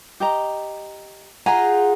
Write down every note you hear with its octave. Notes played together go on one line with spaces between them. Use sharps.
G4 D#5 A#5
D#4 F4 G#4 F#5 G#5 A#5